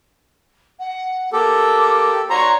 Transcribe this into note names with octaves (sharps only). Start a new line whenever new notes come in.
F#5
A#3 G4 A4 D6
F#4 C#5 D5 A#5 C6